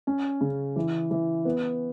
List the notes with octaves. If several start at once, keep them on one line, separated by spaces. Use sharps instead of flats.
C#4
C#3
E3
E3
B3